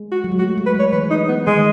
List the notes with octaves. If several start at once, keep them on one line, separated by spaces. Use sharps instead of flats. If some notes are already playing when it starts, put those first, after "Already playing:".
Already playing: G#3
F#4
F#3
G#3
A3 F#4
G#3
B4
G#3
C#5
E3 B4
D#4
B3
D#3 G#3